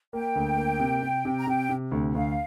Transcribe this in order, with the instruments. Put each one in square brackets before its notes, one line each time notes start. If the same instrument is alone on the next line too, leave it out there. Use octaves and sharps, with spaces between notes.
[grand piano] A#3 [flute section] G5
[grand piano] D2
A#3
C3
C3
C3
[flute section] A#5
[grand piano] C3 [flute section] G5
[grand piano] C3
D2
[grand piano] D2 [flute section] F5